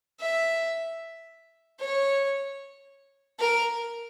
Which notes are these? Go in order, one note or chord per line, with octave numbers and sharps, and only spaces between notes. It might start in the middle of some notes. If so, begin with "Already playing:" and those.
E5
C#5
A#4